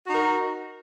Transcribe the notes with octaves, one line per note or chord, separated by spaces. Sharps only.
D#4 F#4 A#4